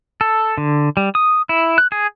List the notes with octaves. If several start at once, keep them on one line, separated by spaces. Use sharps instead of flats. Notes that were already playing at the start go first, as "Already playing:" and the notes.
A4
D3
G3
D#6
E4
F#6
G#4